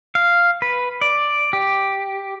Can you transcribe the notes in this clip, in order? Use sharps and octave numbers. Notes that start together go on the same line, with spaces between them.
F5
B4
D5
G4